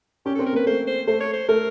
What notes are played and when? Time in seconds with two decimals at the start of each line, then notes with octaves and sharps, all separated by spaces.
0.26 C#4 G4
0.35 A4
0.39 C4
0.46 A#4
0.53 A#3 B4
0.66 A3 C5
0.87 C5
1.07 A3 C5
1.20 C#5
1.33 C5
1.48 A3 A#4